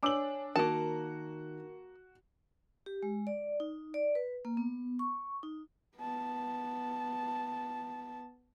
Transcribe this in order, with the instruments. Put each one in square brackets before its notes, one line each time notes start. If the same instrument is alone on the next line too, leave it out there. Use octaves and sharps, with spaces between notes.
[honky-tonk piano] D4 F#7 [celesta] C#5 G#5 [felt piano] D5 D6 E6
[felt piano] D#3 [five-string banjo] A#3 A5 [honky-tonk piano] F#4 [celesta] A#4
[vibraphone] G4
G#3
D5
D#4
D5
B4
A#3
B3
C#6
D#4
[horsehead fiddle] B3 A5